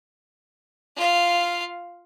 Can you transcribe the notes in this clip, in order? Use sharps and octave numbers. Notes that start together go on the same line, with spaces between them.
F4 F5